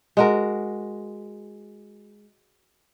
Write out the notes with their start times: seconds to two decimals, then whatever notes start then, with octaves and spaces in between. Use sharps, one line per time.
0.17 G#3 F#4 A#4